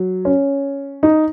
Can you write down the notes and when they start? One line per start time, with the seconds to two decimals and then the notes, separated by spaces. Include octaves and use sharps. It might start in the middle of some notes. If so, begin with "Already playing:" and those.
Already playing: F#3
0.25 C#4
1.03 D#4